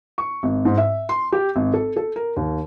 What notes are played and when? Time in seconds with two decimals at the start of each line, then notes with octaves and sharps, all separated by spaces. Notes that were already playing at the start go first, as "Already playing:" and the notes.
0.18 C#6
0.43 G#1
0.65 G#2
0.77 E5
1.09 C6
1.32 G4
1.56 G#1
1.74 A4
1.96 A4
2.16 A#4
2.36 D#2